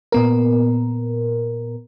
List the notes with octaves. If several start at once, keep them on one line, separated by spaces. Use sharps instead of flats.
A#2 B3 A#4